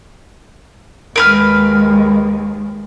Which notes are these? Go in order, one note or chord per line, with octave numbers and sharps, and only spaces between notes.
D#2 G#3 A#4 B4 F6